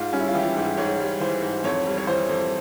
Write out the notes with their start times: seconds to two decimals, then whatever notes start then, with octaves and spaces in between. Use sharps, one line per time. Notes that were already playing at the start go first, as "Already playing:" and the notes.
Already playing: G#2 F4
0.13 G3 C#4
0.20 E4
0.28 F4
0.35 E3 G4
0.56 G#2
0.77 G#2 C#5
1.00 G3
1.20 E3 C5
1.42 G#2
1.64 F2 C#5
1.87 G3
1.98 C#5
2.07 E3 C5
2.29 F2